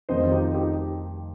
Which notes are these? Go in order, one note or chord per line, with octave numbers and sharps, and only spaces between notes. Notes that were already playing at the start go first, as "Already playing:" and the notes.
F1 F2 D#3 G3 C5 D#5
F4
D#4 G4
D#4 G4